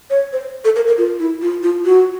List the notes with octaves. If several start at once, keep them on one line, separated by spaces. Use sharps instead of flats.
C#5
C5
A4
A#4
A#4
F4
E4
F4
F4
F#4